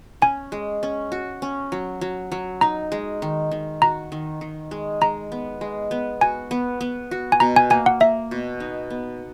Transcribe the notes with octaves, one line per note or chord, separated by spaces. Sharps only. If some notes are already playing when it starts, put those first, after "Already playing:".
C#4 G#5
G#3
C#4
F#4
C#4
F#3
F#3
F#3
D#4 A#5
G#3
D#3
D#3
F#4 A#5
D#3
D#3
G#3
G#3 A#5
B3
G#3
B3
F#4 G#5
B3
B3
F#4
G#5
B2 A#5
G#5
A#3 G#5
F#5
A#3 E5
B2
D#4
B3